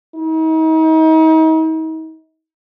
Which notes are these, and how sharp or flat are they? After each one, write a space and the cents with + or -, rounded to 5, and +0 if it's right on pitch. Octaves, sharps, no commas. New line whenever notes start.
D#4 +40